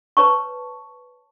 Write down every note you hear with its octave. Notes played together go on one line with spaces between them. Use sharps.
B4 C#5 A5 C#6